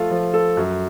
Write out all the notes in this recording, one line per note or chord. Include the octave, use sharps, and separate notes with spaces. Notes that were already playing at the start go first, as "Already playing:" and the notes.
Already playing: F3 A3 F4 A4
F3
A4
F#2